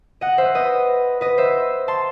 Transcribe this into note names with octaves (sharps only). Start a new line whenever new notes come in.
D#5 F#5
C5 E5
B4 D#5
B4 D#5
C5 E5
A5 C6